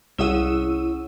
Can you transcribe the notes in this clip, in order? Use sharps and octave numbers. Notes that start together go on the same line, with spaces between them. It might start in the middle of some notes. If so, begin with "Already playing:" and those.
C2 C#4 E4 G#4 F#5 E6 D#7